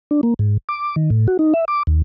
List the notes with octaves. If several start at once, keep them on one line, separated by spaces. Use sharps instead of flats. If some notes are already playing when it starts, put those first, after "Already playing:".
D4
A#3
G#2
D6
D#3
A2
F#4
D#4
E5
D6
D#2